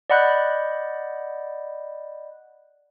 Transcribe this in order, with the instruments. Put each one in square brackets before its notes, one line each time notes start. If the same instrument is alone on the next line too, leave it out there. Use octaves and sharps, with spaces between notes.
[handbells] D5 D#5 F#5 B5 F#6 G6